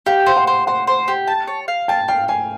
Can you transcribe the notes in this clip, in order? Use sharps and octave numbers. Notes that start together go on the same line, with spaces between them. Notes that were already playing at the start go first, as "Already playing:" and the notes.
G4 F5
C5 F5
F#5
C5
C5 F#5
C5
G4
A5
C#5
F5
G5 A5
F5 G5
F5 G#5